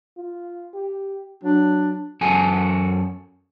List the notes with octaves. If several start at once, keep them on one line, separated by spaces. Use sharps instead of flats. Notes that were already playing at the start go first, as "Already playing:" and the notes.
F4
G4
F#3 D4
F#2 F#4 A4 G#5